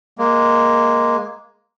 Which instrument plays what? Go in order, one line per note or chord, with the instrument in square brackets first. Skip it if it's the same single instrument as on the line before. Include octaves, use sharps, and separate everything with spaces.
[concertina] G#3 A#3